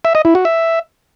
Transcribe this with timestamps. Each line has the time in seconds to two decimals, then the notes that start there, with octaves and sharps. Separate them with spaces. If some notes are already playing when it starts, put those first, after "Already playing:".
0.05 E5
0.15 D#5
0.25 E4
0.35 F#4
0.45 E5